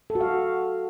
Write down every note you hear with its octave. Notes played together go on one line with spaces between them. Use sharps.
A4
F#4
F5